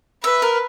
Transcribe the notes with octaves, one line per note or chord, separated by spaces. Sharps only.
B4 E5
A#4